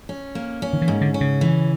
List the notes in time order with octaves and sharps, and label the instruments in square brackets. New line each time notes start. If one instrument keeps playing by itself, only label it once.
[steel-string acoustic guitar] C#4
A#3
C#4
[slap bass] D#3
E3
[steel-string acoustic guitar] G#2
[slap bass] D3
[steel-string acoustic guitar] C#4
[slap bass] C#3
[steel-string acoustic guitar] E3